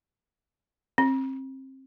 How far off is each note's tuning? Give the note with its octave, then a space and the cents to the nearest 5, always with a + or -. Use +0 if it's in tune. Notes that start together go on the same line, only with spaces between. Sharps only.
C4 +30